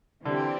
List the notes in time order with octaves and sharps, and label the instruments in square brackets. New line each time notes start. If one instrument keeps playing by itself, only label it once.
[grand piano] D3 [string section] E3 G3 C4 G4